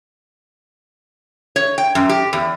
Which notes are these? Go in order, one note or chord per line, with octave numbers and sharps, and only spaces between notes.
C#5
G5
F#2
G4
E2